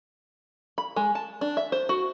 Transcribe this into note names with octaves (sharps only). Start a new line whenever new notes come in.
B5
G#3
A5
D4
E5
C5
F#4